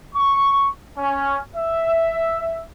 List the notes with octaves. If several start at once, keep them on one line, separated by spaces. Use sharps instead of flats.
C#6
C#4
E5